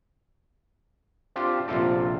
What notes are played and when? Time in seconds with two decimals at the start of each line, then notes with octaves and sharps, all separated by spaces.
1.36 C4 D4 F4 G4 C5
1.68 A#1 C3 F4 A4 D5